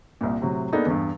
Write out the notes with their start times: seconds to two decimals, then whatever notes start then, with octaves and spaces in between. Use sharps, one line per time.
0.21 C2 A#2
0.41 A2 C3 F#3
0.72 A#3 B3 D4 D#4 G#4 A4
0.86 E2 G2